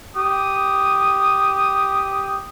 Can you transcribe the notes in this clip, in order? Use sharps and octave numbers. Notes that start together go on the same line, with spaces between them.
G4 D#6